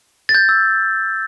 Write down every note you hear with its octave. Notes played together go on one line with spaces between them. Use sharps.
A6
G6
E6